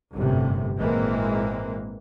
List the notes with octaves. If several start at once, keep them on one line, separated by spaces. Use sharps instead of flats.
G1 F#2 A2 C3
G#1 A#2 E3 G#3 A#3 C4